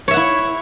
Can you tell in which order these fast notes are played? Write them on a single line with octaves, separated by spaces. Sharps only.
C#5 E5 F#5 E4